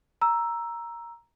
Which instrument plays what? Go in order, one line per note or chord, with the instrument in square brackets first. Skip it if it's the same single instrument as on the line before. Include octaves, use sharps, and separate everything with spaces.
[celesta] A#5 E6